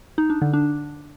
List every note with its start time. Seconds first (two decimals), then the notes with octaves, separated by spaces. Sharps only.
0.18 D#4
0.30 D4
0.42 D3
0.53 D4